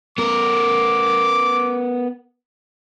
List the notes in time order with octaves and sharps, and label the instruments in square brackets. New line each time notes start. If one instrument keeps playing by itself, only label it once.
[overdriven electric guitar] B3 A#4 [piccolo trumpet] D6